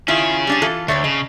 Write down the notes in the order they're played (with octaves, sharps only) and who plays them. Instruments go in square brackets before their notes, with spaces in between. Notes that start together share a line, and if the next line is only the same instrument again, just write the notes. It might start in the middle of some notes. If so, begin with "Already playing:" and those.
[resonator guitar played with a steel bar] D#3 E4 F4 [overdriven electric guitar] C#4 G#4
[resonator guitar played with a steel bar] G3 D4 D5
E3 F4 A4
[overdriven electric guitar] D2 [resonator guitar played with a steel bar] A3 C#5 D5
[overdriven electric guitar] C#3 [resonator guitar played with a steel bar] D#5